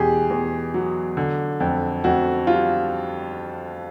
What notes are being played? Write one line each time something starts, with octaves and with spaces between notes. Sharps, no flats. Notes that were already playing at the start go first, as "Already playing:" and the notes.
Already playing: E2 B2 G4 G#4
E2
F#3
D3
F2
F2 F#4
G3 F4